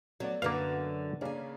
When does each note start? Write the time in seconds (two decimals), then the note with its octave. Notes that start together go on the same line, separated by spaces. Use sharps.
0.20 F#3 A3 B3 D5
0.42 F#2 D3 A#3 F#4 B4 F5
1.21 C#3 A#3 C#4 D4 G#5